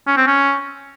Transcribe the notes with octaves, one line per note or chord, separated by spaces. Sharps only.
C#4
C4
C#4